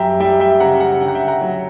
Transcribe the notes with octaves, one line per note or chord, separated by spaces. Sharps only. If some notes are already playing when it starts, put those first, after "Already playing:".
Already playing: F#2 G3 E5 G5 A#5
G3 E5 G5
E5 G5
C#3 F#5 A#5
F#5 A#5
D3 G5
F#5
E5 G5
F#5 A#5
F#3